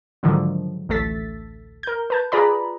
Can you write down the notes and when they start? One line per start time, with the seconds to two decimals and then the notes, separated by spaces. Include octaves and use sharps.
0.23 G#2 D3 D#3 F3 F#3
0.89 A1 D2 A3 A4 A6 B6
1.83 A#4 G6
2.10 B4 A5 G6
2.32 F4 G#4 B4 D5 A#5 B5